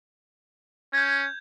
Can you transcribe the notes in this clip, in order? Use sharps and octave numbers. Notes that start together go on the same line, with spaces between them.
C#4 G6 G#6